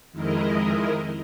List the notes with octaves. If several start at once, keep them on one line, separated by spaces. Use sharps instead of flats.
F2 D#3 G#3 E4 A#4 D#5